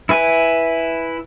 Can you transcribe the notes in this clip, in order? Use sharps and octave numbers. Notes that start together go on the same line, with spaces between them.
E4 B4 G#5